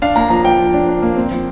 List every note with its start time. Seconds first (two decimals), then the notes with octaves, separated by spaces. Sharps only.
0.02 D4 F5
0.16 A#3 A#5
0.30 F3 A#5
0.44 F3 G5
0.59 F3
0.74 D4
0.88 D4
1.02 A#3
1.16 C4
1.31 F3